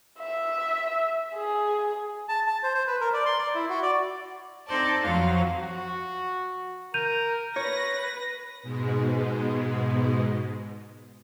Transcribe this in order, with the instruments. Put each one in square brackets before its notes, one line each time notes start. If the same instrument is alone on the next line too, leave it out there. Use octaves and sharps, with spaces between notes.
[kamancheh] E5
G#4
[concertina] A5
A5
C5
C5
B4
A#4
D5
C6
D5
E4
F#4
D5
[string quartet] C4 D#4 A4 C5 D5 A5
F2 F3 F#3 F5 A#6
[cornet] F#4
[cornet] A#4 [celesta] G6 D#7 F7
[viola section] B4 [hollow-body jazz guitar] C#5 [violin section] A#6
[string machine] G#2 B2 G#3